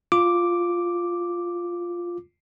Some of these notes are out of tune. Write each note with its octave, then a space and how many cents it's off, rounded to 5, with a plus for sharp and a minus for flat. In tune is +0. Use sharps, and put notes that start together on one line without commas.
F4 +0 D6 +0